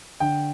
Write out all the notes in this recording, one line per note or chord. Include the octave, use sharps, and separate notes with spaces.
D3 G5